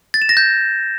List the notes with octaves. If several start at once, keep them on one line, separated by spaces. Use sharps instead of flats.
A6
E7
A#6
G6